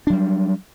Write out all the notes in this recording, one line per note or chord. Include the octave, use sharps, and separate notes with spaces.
F#3 G3 D4